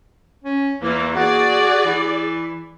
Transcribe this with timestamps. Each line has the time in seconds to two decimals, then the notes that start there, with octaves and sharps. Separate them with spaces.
0.44 C#4
0.82 E2 E3 A#3
1.16 F#4 G#4 D5
1.86 E3